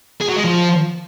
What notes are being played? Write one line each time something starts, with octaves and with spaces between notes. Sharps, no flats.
G#4
F#3
G#3
F3